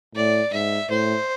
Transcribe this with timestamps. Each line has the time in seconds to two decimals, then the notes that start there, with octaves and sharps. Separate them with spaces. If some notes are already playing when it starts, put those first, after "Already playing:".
0.15 A2 D5
0.52 G#2 E5
0.90 A2 C5